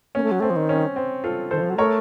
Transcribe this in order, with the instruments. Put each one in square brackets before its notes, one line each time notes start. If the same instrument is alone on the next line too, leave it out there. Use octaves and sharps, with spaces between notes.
[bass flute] A#3 [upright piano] C#4
[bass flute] A3
F#3
[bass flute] A3 [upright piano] C4
[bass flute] F3
D#3
[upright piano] C#4
C4
F4 A4
[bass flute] D#3 [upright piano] A4 C5
[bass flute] F3
F#3
[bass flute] A3 [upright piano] A#4 C#5